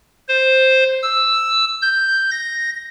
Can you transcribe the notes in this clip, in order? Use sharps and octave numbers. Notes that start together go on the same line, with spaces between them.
C5
E6
G6
A#6